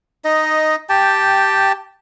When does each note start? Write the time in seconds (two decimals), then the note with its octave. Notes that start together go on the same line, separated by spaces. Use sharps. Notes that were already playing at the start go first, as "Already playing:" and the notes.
0.25 D#4 D#5
0.89 G4 G5 A5